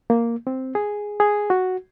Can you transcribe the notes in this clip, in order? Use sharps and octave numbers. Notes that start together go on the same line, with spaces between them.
A#3
C4
G#4
G#4
F#4